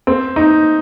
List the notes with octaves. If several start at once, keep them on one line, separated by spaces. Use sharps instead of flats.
C4
D#4